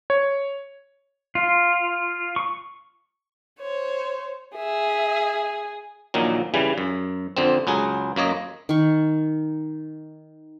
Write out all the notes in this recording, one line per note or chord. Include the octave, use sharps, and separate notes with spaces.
C#5
F4
C#6
C5 C#5
G#4 E5
A#1 A#2 D#3 F#3
C#3 E3 G3
F#2
F2 D3 C4
C#2 F#3 G#4
F#2 A#3 C#5 D#5
D#3 C#6